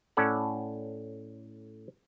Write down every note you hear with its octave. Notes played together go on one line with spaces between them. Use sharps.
A2 C#4 A4 D5 F#5